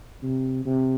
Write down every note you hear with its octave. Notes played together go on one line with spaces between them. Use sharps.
C3
C3